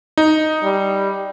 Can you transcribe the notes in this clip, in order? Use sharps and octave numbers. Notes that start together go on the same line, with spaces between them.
D#4
G3